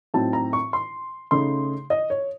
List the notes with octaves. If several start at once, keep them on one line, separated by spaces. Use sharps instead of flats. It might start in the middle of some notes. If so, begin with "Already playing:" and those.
A2 F#3 C4 D#4 A5
A#5
C#6
C6
C#3 A3 D#4 C6
D#5
C#5